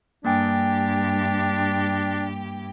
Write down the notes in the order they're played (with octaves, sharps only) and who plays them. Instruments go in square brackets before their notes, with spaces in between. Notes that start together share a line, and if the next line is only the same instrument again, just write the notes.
[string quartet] G2 G4 [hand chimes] A#3 G5 G#5 [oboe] D4